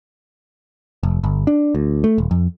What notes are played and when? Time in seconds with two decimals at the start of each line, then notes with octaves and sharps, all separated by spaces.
1.03 F1
1.24 G1
1.47 D4
1.75 D2
2.04 A3
2.18 D#1
2.31 F2